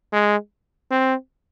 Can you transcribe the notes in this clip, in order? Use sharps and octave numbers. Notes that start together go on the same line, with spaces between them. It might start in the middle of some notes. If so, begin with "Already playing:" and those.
G#3
C4